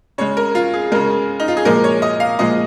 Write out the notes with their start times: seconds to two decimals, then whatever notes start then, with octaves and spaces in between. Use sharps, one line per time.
0.18 C#3 G#3 C#5
0.37 A#4
0.55 F4
0.74 G#4
0.92 C#3 G#3 A#4
1.40 D#4
1.48 F4
1.57 G#4
1.65 A#2 F3 G#3 A#4
1.84 C#5
2.02 D#5
2.20 F5
2.39 A#2 F3 G#3 D#5